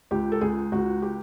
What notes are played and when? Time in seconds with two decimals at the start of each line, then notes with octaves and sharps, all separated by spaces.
0.11 C#2 G4
0.32 A4
0.41 C#2 G#4
0.72 C#2 F#4
1.02 G4